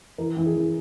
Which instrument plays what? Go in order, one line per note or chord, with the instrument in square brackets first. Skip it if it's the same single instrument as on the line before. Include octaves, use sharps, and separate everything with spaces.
[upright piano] E3 A#4
E3
G#4
E3